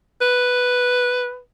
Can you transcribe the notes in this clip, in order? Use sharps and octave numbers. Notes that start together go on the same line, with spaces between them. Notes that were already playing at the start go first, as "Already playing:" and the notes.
B4